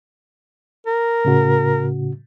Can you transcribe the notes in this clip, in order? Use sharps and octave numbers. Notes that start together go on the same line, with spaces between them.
A#4
A2 C#3 F#4